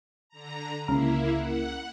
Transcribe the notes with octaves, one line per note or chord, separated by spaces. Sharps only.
D3 A#5
C#2 C#3 A#3 E4 A#4
F#5